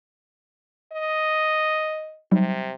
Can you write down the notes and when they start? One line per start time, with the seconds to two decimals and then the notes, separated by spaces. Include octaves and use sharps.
0.92 D#5
2.32 C3 F#3 G3 D#4